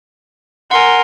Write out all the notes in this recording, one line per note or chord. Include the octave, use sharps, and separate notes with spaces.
A#4 F#5 G#5 C6